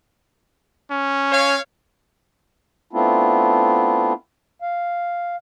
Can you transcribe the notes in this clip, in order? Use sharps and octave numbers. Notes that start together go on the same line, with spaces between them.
C#4
C#5 F5
A3 B3 C4 D4 E4 F4
F5